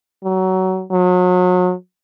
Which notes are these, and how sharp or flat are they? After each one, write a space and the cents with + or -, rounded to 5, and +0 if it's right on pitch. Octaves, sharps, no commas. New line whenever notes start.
F#3 +20
F#3 -35